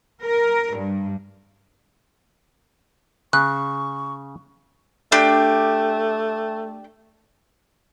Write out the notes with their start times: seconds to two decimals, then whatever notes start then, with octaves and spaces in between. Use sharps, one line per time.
0.24 A#4
0.77 G2
3.33 C#3 C#6 F#6
5.12 A3 D4 G4